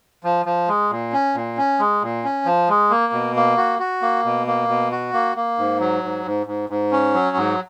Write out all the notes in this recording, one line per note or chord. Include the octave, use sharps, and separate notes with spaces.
F3
F3
G#3
A#2
C#4
A#2
C#4
G#3
A#2
C#4
F3
G#3
A#3
B2
A#3
F#4
F#4
A#3
B2
A#3
B2
F#4
A#3
A#3
G#2
F#3
G#2
G#2
G#2
G#2
C#4
F#3
G#2